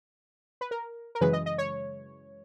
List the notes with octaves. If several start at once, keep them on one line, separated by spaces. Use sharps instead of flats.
B4
A#4
A#4
F#2 C#3 E3 G#3 B4
D#5
D#5
C#5